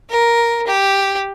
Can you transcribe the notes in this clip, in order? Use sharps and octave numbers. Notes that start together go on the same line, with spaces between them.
A#4
G4